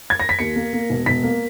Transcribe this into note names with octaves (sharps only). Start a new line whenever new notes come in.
G#6
A#6
B6
D#2 C#7
A#3
A#3
E1
E1 B6
A#3